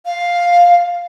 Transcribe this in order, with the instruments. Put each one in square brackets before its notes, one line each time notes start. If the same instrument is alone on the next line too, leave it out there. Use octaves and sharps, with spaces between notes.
[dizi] F5